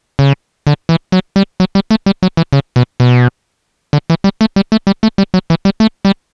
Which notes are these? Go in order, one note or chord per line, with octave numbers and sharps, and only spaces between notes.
C#3
D3
E3
F#3
G3
F#3
G3
A3
G3
F#3
E3
C#3
B2
B2
D3
E3
G3
A3
G3
A3
G3
A3
G3
F#3
E3
G3
A3
G3